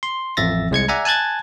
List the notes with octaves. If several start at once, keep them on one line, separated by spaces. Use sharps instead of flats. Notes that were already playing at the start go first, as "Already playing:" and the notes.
C6
A1 F2 E5 A6 A#6
C2 G#3 G#6 C#7
D5 E5 F#5 G#5 A#5
G#5 A5 F#6 G#6 A6